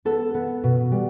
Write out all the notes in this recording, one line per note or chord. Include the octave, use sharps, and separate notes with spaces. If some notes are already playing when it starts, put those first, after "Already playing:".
B3 A4
B3
B2
G3